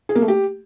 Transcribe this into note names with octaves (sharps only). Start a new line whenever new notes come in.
G#4
A#3
A3
G4